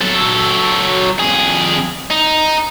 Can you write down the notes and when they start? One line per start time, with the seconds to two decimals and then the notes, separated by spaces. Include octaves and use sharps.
0.01 F#3 A4
1.19 F2 G#4
2.10 D#4